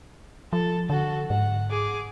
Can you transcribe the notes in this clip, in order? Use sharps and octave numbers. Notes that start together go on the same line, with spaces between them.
F3 A4
D3 F#4 A4
G#2 F#5
G#4 D6